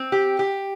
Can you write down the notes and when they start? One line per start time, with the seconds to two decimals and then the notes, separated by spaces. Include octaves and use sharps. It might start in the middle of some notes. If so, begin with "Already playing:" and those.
Already playing: C4
0.12 G4
0.39 G4